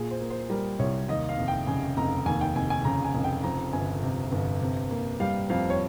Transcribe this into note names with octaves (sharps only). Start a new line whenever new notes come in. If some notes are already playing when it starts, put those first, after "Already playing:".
Already playing: A#2 G#4
C5
A#3
C5
G3 A#4
C2 C#5
D#2 D#5
F5
F1
G5
C#3 G#5
F1 A#5
D#2 G#5
G5
F1 G#5
G#5
C#3 A#5
G#5
F1
G5
F2 A#5
G1 G#5
C3
G1
C3
A#3
G3 F5
F2 F5
C#5